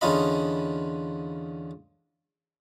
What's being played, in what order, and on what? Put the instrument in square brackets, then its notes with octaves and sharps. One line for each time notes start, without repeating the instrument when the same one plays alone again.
[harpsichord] E2 D3 C#4 F4 D#5 B5